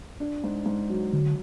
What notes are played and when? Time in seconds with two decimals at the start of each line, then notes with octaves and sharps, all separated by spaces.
0.20 D4
0.44 G#2
0.66 G#2
0.89 F#3
1.12 D3 F#3